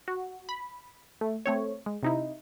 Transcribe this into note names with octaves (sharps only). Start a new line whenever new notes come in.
F#4
B5
A3
A3 C4 C#5
G#3
C3 D#4 E4